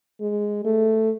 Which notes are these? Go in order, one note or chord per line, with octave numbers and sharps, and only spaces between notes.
G#3
A3